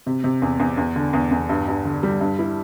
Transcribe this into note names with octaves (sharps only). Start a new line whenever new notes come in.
C3
C3
E2
E2
E2
D3
E2
E2
G2
G2
D3
G3
G2
E4